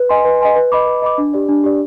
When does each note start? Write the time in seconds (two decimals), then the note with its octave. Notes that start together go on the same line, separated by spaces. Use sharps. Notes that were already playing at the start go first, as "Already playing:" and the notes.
Already playing: B4
0.09 D#5 G#5 C6
0.25 B4
0.41 D#5 G#5 C6
0.56 B4
0.72 D#5 B5 D6
0.87 B4
1.02 D#5 B5 D6
1.18 D4
1.34 G4 D5
1.49 D4
1.64 G4 D5